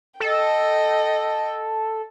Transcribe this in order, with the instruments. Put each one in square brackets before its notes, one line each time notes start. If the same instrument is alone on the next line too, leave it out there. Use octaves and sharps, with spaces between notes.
[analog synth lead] A4 [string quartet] D#5 G5